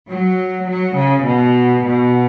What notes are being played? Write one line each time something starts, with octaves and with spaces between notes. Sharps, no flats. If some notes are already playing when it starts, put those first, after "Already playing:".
F#3
F#3
C#3
B2
B2